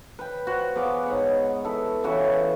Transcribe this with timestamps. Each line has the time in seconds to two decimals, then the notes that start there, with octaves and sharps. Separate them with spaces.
0.19 B4 G5
0.47 F#4 C5
0.76 B3 G#4 F5 D6
1.06 G#2 C#5 F#5
1.65 E4 A4
2.04 C#3 E3 F#4 E5